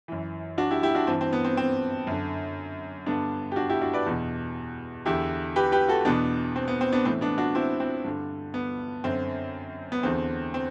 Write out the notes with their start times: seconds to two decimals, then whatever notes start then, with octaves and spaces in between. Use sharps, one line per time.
0.08 F#2 E3
0.58 D4 F#4
0.70 E4 G4
0.83 E4 G4
0.95 D4 F#4
1.07 G2 E3 C4
1.21 C4
1.33 B3
1.44 C4
1.57 C4
2.07 F#2 D3
3.06 G2 D3 B3 D4
3.52 G4
3.56 D4 F#4
3.69 E4 G4
3.81 D4 F#4
3.93 B4 D5
4.06 E2 B2
5.05 E2 D3 E4 G4
5.56 G4 B4
5.72 G4 B4
5.88 F#4 A4
6.05 E2 B2 B3 D4
6.56 C4
6.68 B3
6.81 C4
6.92 B3 D4
7.05 A2 E3 C4
7.21 B3 D4
7.38 D4 F#4
7.55 C4 E4
7.80 C4
8.04 G2 D3
8.54 B3
9.04 F#2 D3 C4
9.92 B3
10.03 E2 D3 C4
10.54 C4